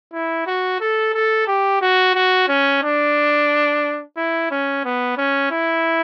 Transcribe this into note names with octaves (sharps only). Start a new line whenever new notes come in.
E4
F#4
A4
A4
G4
F#4
F#4
C#4
D4
E4
C#4
B3
C#4
E4